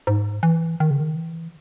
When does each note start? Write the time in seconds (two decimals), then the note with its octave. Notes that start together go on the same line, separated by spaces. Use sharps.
0.07 G#2
0.43 E3
0.80 D#3
0.90 C#3
1.00 D#3
1.15 E3